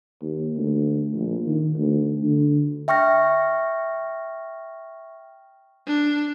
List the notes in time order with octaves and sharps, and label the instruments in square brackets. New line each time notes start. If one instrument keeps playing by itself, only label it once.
[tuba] D#2
D2
A#1
D#3
D2
D3
[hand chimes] E5 G5 C#6 F6 A#6
[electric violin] D4